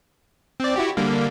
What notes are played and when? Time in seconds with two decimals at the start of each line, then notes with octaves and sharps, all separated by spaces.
0.60 C4 D5
0.76 E4 F#4 G4
0.97 D3 G3 A#3